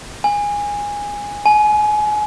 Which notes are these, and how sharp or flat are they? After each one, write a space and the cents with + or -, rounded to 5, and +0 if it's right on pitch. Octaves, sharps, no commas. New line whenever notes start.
G#5 -15
G#5 +30